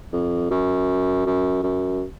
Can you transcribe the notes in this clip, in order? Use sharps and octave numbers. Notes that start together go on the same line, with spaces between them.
F2
F#2
F#2
F#2